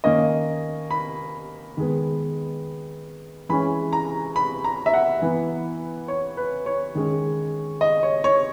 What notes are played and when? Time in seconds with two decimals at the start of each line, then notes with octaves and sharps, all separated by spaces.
0.04 D#3 A#3 C#4 D#5
0.91 B5
1.77 D#3 G#3 B3
3.49 E3 G#3 C#4 B5
3.93 A#5
4.36 B5
4.64 A#5
4.86 E5
4.94 F#5
5.22 E3 B3
6.08 C#5
6.37 B4
6.66 C#5
6.95 D#3 G#3 C#4
7.81 D#5
8.03 C#5
8.24 C#5